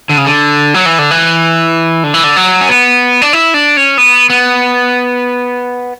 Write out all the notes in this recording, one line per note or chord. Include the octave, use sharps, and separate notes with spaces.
D3
C#3
D3
F#3
E3
D3
E3
D3
E3
D3
F#3
C#4
B3
D4
E4
D4
C#4
B3
B3